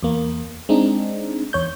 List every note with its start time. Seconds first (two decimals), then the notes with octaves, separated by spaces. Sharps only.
0.03 E2 A#3
0.69 G#3 C4 D4 D#4
1.53 E2 C#5 G6